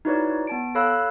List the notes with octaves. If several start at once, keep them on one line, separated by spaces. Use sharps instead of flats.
D#4 E4 F#4 B4 C#5 D5
B3 A5 D7
A4 C#5 F5 B5 E6 F#6